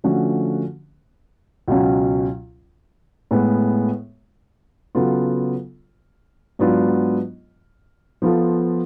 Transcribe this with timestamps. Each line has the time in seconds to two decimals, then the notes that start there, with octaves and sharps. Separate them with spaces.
0.04 D3 F3 A3 C#4 F#4
1.68 C#2 B2 F#3 C#4
3.31 A2 G#3 B3
4.95 C#3 F#3 B3 F4 A4
6.59 G#2 F#3 B3 D4 F4
8.22 F3 B3 F4 A4